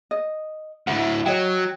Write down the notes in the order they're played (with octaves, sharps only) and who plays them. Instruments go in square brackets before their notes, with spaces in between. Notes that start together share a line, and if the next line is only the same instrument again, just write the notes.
[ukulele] D#5
[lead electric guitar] D2 A2 [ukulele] F#5
[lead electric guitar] F#3 [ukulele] C#5 D#5 G5